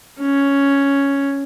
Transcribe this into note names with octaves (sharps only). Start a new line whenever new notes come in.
C#4